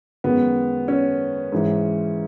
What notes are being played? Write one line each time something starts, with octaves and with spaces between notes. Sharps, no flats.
F#2 D#3 G#3 B3
C#4
G#2 E3 G#3